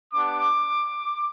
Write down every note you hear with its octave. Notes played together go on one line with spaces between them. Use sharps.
B3 D4 G4 D6